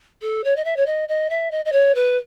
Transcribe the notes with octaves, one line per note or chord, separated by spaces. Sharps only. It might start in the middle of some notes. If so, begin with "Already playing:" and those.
A4
C#5
D#5
E5
C#5
D#5
D#5
E5
D#5
D#5
C#5
B4